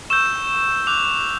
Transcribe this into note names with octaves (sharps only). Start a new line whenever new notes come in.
C#6 E6 G6 E7
D6 F#6 F7